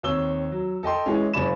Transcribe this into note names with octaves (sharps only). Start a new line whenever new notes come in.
D#2 C4 C#5 E6 G7
F#3
A4 D#5 G5 C6
E3 G#3 C#4
F#1 C#3 C#5 D5 B5 E7